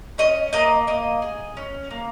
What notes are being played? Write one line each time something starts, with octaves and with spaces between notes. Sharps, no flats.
C#4 D#5
A#3 D#5
A#3 D#5
G#4
C#4
A#3